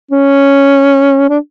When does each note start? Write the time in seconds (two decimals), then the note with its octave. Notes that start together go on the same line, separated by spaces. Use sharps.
0.11 C#4
1.30 D4